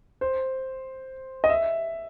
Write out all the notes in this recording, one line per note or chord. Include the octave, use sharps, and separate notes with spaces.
C5
D#5
E5